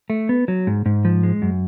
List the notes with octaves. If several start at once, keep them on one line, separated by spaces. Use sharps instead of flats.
A3
B3
F#3
G#2
G#2
F3
G#3
F#2